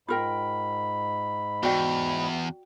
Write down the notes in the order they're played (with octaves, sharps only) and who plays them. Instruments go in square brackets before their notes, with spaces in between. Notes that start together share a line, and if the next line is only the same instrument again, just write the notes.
[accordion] G#2 B5 [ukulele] F4 A#4 G5
[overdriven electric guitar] E2 [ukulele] F#4 D5 G5